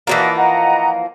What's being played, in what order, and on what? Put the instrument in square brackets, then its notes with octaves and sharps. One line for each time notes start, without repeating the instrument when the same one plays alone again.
[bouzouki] E3 F3 A#3 [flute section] F#4 D5 D#5
[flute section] D#5 F#5 A#5